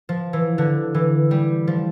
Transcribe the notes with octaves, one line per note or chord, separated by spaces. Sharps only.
F3
E3
D3
E3
G3
F3